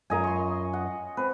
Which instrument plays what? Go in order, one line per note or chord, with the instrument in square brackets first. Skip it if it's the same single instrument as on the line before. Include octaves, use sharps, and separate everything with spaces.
[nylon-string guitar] F#2 F4 A#4 [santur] D#5 G#5
[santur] C6 C#6
F#5
[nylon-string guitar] C4 [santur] B4